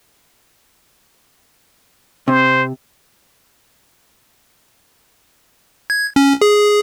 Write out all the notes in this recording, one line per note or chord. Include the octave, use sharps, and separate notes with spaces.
C3 C5
G#6
C#4
G#4